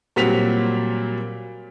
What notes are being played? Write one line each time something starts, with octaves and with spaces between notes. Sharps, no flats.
A#2 F#3 G3 C4 B6 F7